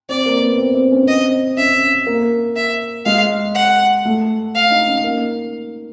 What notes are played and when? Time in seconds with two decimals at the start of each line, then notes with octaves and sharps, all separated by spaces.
0.09 C4 D5
0.26 A#3
0.42 B3
0.58 C4
0.75 C4
0.92 C#4
1.02 C#4
1.08 C4 D#5
1.57 C#4 E5
2.07 A#3
2.56 E5
3.05 G#3 F5
3.55 F#5
4.05 A3
4.54 F5
4.70 D#4
4.87 C#4
5.04 A#3